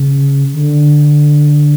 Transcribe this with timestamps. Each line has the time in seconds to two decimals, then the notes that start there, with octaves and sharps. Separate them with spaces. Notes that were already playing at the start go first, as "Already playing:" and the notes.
Already playing: C#3
0.53 D3